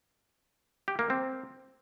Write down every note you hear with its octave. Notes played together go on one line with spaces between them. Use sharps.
G4
A#3
C4